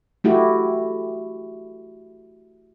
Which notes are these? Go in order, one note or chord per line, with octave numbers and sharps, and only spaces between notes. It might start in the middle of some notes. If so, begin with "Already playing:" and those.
A3 E4 F#4 G4